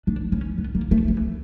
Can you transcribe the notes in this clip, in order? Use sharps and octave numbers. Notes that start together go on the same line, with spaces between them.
D4
C#4
B3
A#3
A3
E3